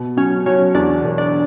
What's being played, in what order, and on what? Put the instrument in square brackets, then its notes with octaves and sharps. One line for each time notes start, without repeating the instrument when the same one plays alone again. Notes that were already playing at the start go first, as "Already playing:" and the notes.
Already playing: [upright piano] B2
[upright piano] F#3 [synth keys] C#4
[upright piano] F#3 [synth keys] C#4
[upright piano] E2 [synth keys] D4
[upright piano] E1
[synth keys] D4